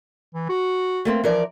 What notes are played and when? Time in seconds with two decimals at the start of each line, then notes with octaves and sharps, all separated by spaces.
0.34 E3
0.49 F#4
1.05 A3 A#3 C4
1.24 E3 F3 A#4 D5